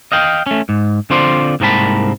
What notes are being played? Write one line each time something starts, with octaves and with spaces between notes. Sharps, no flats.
D#5 F5 G5
A3 C#4
G#2
D3 C4 F4 C5 D5
C2 G#2 A#3 C4 A5 B5